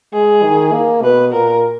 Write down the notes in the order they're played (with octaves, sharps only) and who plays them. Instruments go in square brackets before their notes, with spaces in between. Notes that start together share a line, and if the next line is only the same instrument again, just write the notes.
[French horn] G#3 [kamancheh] G#4
[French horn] D#3
A#3
[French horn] B2 [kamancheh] B4
[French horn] A#2 [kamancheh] A#4